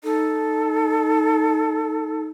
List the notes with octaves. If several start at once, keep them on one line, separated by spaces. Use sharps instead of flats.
D#4 A4